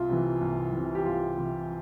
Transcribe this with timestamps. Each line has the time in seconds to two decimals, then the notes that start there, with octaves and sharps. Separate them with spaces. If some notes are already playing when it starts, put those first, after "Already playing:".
Already playing: C2 F4
0.09 C3 E3
0.41 C2
0.73 C3 E3
0.95 G4
1.05 C2 F4
1.38 C3 E3